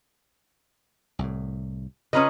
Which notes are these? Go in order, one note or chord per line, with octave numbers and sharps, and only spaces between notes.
C2 A2
C#3 C#4 F4 B4 D#5 A#5 D#6